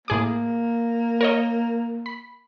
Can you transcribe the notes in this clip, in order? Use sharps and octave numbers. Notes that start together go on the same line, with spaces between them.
A2 A#3 G#4 D6
A#4 C#5 D#5
B5